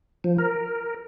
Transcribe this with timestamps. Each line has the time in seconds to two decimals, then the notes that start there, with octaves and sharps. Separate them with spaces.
0.24 F3
0.38 A#4